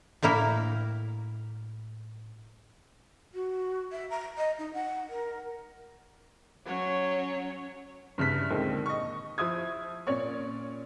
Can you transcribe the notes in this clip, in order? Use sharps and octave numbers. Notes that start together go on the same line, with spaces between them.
A2 A#3 E4 A#4
F#4
E5
A#5
D#5
D#4
F#5
A#4
F#3 C#4 C#5
G2 C#3 E4 B6
D#2 A#2 D3 D#3 G#3 C4
D#5 C#6
F3 E4 D#6 G#6
A#2 C#4 C#5 D5 C#6